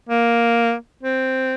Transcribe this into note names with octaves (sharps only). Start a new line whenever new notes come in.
A#3
C4